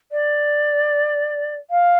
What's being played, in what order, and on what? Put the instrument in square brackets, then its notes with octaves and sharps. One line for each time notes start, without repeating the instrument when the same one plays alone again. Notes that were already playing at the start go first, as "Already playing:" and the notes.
[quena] D5
F5